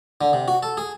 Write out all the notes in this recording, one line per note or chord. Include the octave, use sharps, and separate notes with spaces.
D3
C3
F#4
A4
G#4